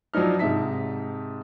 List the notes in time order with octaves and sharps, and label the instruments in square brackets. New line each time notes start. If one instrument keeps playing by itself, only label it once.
[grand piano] F3 F#3 D4 D#4 F6
G#2 C3 D#4 E5 A5 B6